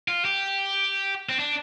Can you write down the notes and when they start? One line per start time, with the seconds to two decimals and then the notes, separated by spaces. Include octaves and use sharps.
0.08 F4
0.25 G4
1.29 C4
1.40 D4